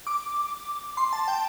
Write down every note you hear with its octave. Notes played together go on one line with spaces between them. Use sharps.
D6
C6
A5
G5